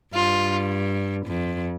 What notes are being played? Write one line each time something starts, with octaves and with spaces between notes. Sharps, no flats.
G2 F4
F2